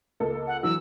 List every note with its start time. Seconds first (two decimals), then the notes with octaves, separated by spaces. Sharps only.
0.20 C#2 A#3 A4
0.47 F#5
0.63 E3 F#3 E6